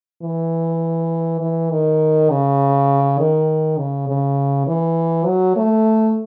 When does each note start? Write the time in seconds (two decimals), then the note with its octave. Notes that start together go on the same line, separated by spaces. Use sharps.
0.22 E3
1.41 E3
1.71 D#3
2.30 C#3
3.19 D#3
3.78 C#3
4.08 C#3
4.67 E3
5.26 F#3
5.56 A3